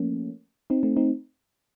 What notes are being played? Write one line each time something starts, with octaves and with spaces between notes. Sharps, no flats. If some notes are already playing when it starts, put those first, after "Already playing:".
Already playing: F3 A3 A#3 C#4
C4 D#4
A3 C4
C4 D#4